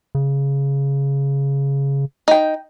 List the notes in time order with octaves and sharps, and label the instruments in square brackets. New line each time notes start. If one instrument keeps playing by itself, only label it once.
[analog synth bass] C#3
[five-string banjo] D#4 G5